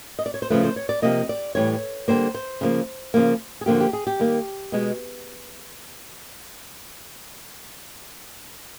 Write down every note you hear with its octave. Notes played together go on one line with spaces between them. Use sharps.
D#5
D5
C#5
C5
C#3 F3 A3 B4
C5
C#5
D5
C3 F3 A#3 D#5
D5
A2 E3 G3 C#5
D3 G3 A#3 C5
C5
C#3 F3 A#3
C#3 F3 A#3
G#4
D3 F3 A#3 G4
F#4
G4
G#4
G4
D#3 G3 A#3
B2 G#3